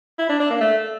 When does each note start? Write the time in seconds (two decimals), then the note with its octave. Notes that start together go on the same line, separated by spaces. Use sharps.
0.19 E4
0.29 D4
0.40 D4
0.50 A#3
0.61 A3